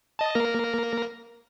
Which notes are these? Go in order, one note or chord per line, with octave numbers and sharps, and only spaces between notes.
D#5 A5
A#3 A#4 A#6